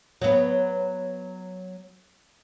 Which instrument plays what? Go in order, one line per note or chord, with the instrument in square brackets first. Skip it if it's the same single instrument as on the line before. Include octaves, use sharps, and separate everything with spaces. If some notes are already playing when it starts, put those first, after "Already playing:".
[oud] F#3 B3